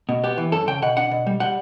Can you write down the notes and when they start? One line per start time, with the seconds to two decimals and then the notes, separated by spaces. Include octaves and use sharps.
0.09 B2
0.24 B3 G4
0.38 E3
0.52 F#2 A4
0.67 C#3 G5
0.82 B2 F#5
0.97 D4 F#5
1.11 B2
1.27 G3
1.40 G3 F#5